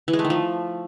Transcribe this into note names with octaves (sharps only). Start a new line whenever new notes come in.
E3
G#3
A3
D#3
F3